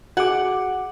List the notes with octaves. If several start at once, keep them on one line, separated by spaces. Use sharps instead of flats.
F#4 G#4 F#5 D6